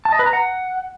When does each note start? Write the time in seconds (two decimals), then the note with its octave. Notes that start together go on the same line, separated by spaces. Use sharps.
0.05 A5
0.12 D#5
0.19 B4
0.26 A#5
0.33 F#5